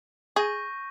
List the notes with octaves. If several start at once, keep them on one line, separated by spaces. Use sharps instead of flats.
G#4 C#6 G6 A#6 D#7